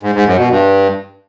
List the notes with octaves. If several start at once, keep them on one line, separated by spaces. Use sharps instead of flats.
G#2
G#2
F#2
B2
G2